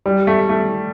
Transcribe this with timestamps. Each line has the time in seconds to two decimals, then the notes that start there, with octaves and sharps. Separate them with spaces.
0.06 G3
0.27 A3
0.49 A3